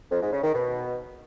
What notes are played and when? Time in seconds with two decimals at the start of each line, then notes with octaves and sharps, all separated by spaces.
0.11 F2
0.22 G#2
0.33 C#3
0.43 D#3
0.54 B2